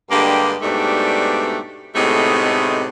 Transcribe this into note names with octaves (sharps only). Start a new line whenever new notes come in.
G2 D3 G#3 A#3 G4
G#2 B2 G3 A3 D4 G4
A2 C3 G#3 A3 B3 D#4